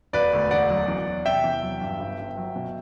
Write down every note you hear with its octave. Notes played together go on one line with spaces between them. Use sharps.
E1 B4 D5
D2
E1 D5 F#5
F#3
E2
F#3
C3 E5 G5
E2
F#3
G2
G1
G1
F#3
B2